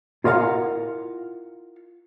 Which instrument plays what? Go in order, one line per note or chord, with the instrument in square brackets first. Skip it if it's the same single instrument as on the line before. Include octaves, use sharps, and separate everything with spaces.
[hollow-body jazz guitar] E4 F4 A#4 D#5 F5 F#5